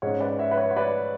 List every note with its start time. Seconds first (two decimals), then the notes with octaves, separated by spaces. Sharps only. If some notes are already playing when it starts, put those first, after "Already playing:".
0.02 G#2 G#3 C#4 C#5
0.20 B4 D5
0.39 C#5 E5
0.51 B4
0.57 C#5
0.71 C#5
0.76 B4 D5